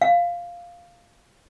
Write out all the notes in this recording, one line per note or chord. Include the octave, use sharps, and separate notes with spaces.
F5